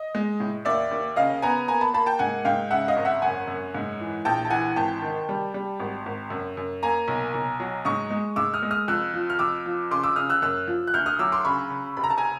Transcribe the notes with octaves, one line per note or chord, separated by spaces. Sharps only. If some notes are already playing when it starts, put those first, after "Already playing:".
Already playing: D#5
G#3
A2
D#2 D5 E5
D#2
C#3 D#5 F5
B3 G#5 A#5
A#3 G#5 A#5
A5 B5
A#3 A5 B5
G5 A5
G#2 F#5 G#5
G#2 F5 G5
C#3 E5 F#5
D#5 F5
G#1
E5 F#5
F#2 F#5 G#5
F#2
G#2
E3
A#1 G5 A5
A5
E3 F#5 G#5
G#1 G5 A5
D#3
G3
G3
G#1
G#1
F#2
F#2
A#3 G#5 A#5
B1
B1
F#3
G#2 C#6 D#6
G#3
G#2 D6 E6
D#6 F6
G#3
D#6 F6
F2 E6 F#6
F3
F6
F2 D6 E6
F3
C#3 C6 D6
D6 E6
C#3 D#6 F6
E6 F#6
F#2 E6 F#6
F3
F#6
D2 F6 G6
D#6 F6
F#3 D6 E6
C6 D6
C#3 B5 C#6
C#3
F1 B5
A#5
A5
G#5 A#5